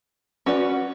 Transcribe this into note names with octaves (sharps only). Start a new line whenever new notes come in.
C#4 F#4 B4 D5